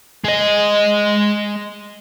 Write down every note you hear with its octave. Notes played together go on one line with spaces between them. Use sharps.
G#3 D#5